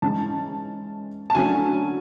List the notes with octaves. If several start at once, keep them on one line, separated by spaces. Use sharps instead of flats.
G#2 E3 G#3 C#4 A5
A5
D3 F#3 A3 C#4 G#5